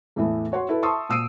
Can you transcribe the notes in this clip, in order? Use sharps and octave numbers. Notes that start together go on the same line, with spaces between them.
E2 A2 E3 A3 B3
F#4 C#5 F#5 C6
E4 A4 B4
E5 A5 C6 C#6 D#6 E6
A#2 D#6 E6 C7 D7 D#7